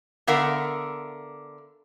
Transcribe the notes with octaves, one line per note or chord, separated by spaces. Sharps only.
D3 B3 A#4 E5 F5